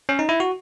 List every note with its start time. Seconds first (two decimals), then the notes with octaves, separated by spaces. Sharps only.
0.09 C#4
0.19 D#4
0.29 E4
0.40 F#4